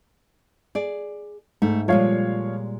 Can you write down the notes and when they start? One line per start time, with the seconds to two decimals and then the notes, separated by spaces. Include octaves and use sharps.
0.75 G#4 D5
1.62 G#2 A3
1.88 A#2 F3 G3 G#3 C#5 F5